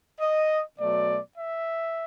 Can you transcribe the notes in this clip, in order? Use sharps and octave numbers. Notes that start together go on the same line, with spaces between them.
D#5
B2 F#3 A3 D5
E5